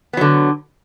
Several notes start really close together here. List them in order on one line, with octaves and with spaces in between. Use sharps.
B3 F#3 D3